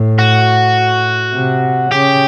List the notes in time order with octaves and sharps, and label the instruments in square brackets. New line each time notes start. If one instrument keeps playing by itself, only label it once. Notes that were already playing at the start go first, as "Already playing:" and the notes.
Already playing: [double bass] A2
[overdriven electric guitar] F#4
[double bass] C3
[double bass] C#3 [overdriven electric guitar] G4